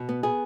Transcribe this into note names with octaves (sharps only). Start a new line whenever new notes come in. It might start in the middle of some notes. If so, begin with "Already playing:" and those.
Already playing: B2
B3
B3 G#4